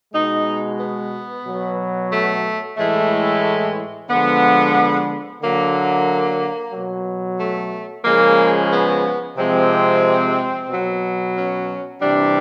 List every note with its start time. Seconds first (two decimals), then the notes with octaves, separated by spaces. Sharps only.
0.13 B2 G#3 D#4
0.80 B3
1.45 B2 F#3
2.12 A3
2.77 A2 E3 G#3 A3
4.09 D3 F3 G#3 B3
5.41 D3 F#3 A#3
6.73 B2 F#3
7.40 A3
8.05 C#3 F3 G#3 A#3
8.72 B3
9.37 C3 F3 G#3 C4
10.69 B2 F#3
11.36 C#4
12.01 C3 E3 G3 D4